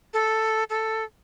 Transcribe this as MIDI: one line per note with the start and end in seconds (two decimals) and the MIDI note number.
0.14 0.64 69
0.70 1.04 69